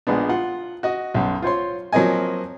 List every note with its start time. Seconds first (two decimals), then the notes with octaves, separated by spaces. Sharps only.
0.07 A#1 G#3 B3 D4
0.29 F4 F#5
0.83 F#4 D#5
1.14 B1 F#2
1.42 F4 C5 C#5 C6
1.92 F3 F#3 A#3 C4 D#5 G#5